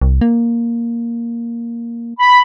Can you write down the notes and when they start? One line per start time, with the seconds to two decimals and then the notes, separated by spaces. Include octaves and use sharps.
0.02 C2
0.21 A#3
2.20 B5